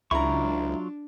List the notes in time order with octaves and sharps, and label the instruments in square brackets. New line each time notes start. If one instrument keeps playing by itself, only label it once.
[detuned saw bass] C#2 [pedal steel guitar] F#3 F4 C#6 [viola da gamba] D4 [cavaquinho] E4 A#5